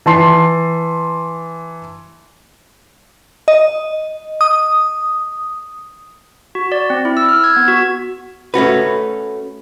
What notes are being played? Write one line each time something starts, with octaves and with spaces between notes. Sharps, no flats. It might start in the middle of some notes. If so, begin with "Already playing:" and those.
E3 A5 C6 C7
D#5
D#6
F#4
D5
C4
E4
E6
F6
G#6
B3
F#4
A3 C#4 F#4 B4